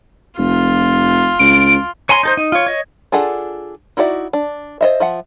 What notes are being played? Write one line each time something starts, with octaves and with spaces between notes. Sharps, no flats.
F1 F4
C#2 D7
C#5 G#5 A#5 C6
D#4 A4 C5
D#4
F4 C#5
C#5 D#5
D4 F4 G#4 A4 F#5
D#4 E4 F#4 D5 E5
D4
C5 D#5 E5
F3 E5 F#5